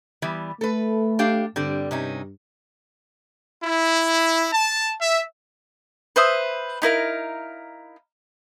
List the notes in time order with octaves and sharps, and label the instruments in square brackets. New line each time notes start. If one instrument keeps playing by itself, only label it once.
[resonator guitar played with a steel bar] E3 G3 B3
[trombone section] A3 [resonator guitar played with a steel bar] A4 B4
[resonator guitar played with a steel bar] D4 G4 F5
[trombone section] G2 [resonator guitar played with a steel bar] D3 G3 C4
[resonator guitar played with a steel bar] C3 C#4 D#4
[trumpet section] E4
A5
E5
[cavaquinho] B4 C5 E5 D#6
D#4 E4 A#4 F5